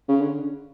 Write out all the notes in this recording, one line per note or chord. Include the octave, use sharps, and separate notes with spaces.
C#3
D3